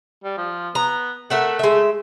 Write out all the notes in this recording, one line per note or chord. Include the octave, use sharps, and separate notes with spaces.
G3
F3
B3 A#5
A3 A#4 E5 F#5
G#3 E5